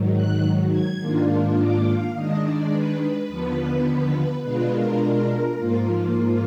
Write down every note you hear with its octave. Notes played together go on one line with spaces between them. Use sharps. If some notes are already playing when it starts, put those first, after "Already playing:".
Already playing: G#2 D#3 F#3
F#6
G#6
G#2 D#3 A#3 D4 F4
D6
F5
D#3 G#3 D4 D#5
D5
B4
B4
D#2 D3 F3 B3
B2 G#3 D4 F4 B4
A#4
G#2 F3 A#3 F4